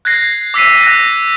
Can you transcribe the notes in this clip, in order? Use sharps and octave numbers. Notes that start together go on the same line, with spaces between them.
F#6 G#6 A#6 C7
D6 E6 B6 C7 D#7
F#6 A#6